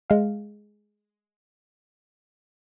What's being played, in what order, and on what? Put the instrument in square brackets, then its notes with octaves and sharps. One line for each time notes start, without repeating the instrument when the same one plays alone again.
[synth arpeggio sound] G#3 F5